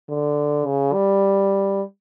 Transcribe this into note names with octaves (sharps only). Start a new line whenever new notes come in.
D3
C#3
G3